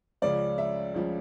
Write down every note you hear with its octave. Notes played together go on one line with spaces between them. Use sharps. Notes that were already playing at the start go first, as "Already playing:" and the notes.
C#2 C#3 F3 C#4 D5
E5
C#2 C#3 F3 C#4